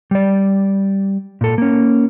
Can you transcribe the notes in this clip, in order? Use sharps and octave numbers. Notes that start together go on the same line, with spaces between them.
G3 D5
A#2 A4
A#3 C#4